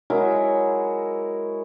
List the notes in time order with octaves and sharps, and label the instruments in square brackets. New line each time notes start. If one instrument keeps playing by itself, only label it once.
[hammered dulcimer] F#3 G#3 E4 A#4